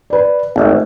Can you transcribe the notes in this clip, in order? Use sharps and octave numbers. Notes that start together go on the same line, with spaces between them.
B4 D5
G#1 A3